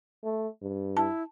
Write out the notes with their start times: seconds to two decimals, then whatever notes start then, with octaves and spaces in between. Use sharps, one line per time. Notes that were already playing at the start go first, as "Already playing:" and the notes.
0.23 A3
0.62 G2
0.97 E4 A5